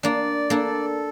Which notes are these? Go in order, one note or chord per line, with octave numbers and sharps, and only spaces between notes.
A#3 D4 D5
A#3 D4 A4